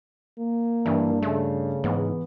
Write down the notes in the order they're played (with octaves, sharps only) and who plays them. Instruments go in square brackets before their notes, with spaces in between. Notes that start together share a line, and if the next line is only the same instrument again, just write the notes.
[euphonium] A#3
[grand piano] G2 [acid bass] E3
[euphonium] C#3 [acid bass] A3
[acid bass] G#2 [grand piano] E3 B3